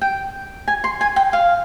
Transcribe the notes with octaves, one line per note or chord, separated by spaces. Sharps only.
G5
G#5
C6
G#5
G5
F5